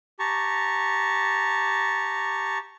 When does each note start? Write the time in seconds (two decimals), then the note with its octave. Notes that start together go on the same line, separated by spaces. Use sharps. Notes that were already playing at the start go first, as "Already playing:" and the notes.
0.19 G4 A5 A#5 C#6